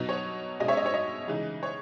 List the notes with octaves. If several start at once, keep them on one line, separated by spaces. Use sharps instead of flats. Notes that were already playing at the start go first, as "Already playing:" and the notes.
Already playing: B2 F#3 B3 D#4 D#5
C#5
B2 G#3 C#4 D#5
C#5 E5
D#5
C#5
D#5
C#3 E3 G#3 D#4
C#5